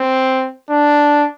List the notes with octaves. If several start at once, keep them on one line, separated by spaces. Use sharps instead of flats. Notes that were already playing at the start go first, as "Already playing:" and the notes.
Already playing: C4
D4